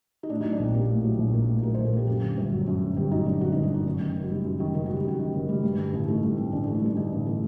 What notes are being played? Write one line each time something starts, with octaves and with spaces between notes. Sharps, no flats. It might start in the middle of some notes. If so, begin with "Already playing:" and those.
D#4
A2 D4
F#3 D#4
D4
A#1 C4
A#3 G4
A2
F#3
A#1
A#3
A2
F#3 A#4
A#1 C5
A4
A#3 G4
F#2 G4
D3
G1
F#3
F#2
D3
G1 G4
F#3 D#4
F#2 D4
D3 F#4
G1 D#4
D4
F#3 D#4
F#2
D#3
F#1
F#4
G3 D#4
F#2
D#3
F#1 D#4
G3 F#4
G4
F#2 F#4
D#3
F#1
G3
G2
D3
A1
A3 D#4
G2
D3 C4
A1 D4
A3 D4
D#4
G2 D4
D3 D#4
A1
A3